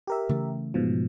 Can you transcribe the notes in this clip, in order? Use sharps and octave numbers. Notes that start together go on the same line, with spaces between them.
G4 A#4 E5
C#3 E3 A3
G#2 B2 F3